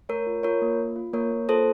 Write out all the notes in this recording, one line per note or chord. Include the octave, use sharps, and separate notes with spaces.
A3 A#4 C#5
F4
F4 A#4 C#5
A#3
F4
F4
A#3 A#4 C#5
A#3
F4 A4 C5